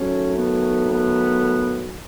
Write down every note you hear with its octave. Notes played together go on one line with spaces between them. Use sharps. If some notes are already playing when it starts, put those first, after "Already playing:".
Already playing: D#3 F#3 A3 C#4
B3
B3